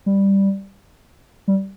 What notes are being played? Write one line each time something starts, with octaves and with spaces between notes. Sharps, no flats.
G3
G3